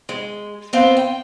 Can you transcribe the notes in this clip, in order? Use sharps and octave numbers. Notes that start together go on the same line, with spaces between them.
G#3
B3 C4 F5
G5